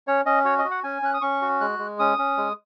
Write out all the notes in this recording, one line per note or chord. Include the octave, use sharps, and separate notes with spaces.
C#4 C#5
C#4 D#5
F#4 C#5
D#5
F#4
F#5
C#4 G#5
C#4 F#6
D#6
C#4 C#6
F#4
G#3 F#6
G#3
C#4 D#6
C#4
G#3